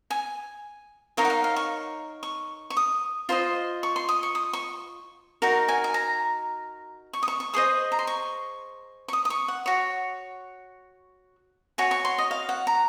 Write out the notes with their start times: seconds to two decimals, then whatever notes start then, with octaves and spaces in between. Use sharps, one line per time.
0.10 G#5
1.17 D#4 A#4 C#5 F5
1.25 F#5
1.30 F5
1.44 F5
1.56 C#6
2.23 C#6
2.70 C#6
2.77 D#6
3.29 F4 C5 D#5
3.83 C#6
3.96 C6
4.09 D#6
4.23 C#6
4.35 D#6
4.53 C#6
5.42 D#4 F#4 A#4
5.69 G#5
5.84 G#5
5.94 A#5
7.13 C#6
7.23 D#6
7.28 C#6
7.40 C#6
7.54 G#4 C5 D#5 D#6
7.92 A#5
7.99 C6
8.07 C#6
9.08 C#6
9.13 D#6
9.25 D#6
9.30 C#6
9.48 F#5
9.66 F#4 C#5
11.78 F#4 C#5 G#5
11.91 C#6
12.05 C6
12.18 D#5
12.31 F5
12.49 F#5
12.67 A#5